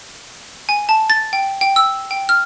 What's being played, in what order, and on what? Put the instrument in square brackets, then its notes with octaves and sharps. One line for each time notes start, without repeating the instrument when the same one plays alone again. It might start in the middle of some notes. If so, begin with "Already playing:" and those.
[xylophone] G#5
A5
A6
G5
G5
E6
G5
F6